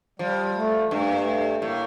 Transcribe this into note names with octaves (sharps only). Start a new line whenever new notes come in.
F3 G3
A3
G2 A3
A#3
A3
A2 A#3